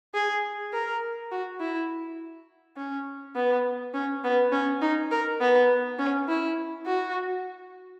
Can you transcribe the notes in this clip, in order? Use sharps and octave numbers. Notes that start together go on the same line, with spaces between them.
G#4
A#4
F#4
E4
C#4
B3
C#4
B3
C#4
D#4
A#4
B3
C#4
E4
F#4